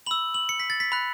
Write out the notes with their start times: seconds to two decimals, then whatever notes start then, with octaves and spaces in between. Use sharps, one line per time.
0.06 B5 E6 F#7
0.34 F#7
0.49 C#7
0.60 B6
0.70 A6
0.80 B6
0.92 B5 F#6